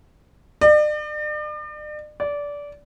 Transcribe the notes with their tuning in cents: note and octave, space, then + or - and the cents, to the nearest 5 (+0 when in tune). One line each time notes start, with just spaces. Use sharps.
D5 +40
D5 -20